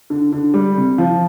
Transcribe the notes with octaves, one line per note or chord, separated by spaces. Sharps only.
D3
D3
G3
C3
F3